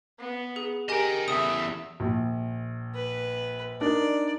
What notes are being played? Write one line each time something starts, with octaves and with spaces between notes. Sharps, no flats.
B3
G#4
G4 A#4 D#5 G5 G#5 A#5
E2 C#3 A4 E5 D#6
A#1
B4
D4 D#4 A#4 D5